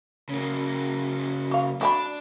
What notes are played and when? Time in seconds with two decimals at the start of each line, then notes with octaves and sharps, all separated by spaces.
0.29 C#3 A#3
1.51 F#4 F5
1.81 D4 F#4 G5 B5